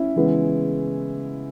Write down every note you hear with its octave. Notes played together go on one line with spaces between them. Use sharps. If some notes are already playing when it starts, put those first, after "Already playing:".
Already playing: C#4 E4
C#3 E3 G#3 B3